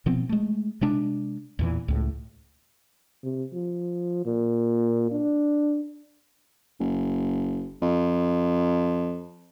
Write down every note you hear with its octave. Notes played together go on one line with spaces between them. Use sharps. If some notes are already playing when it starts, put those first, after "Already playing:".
B2 F3 B3 C4
G#3 A3
C3 G#3 D4
E2 A#2 E3
C#2 A2
C3
F3
A#2
D4
F#1
F2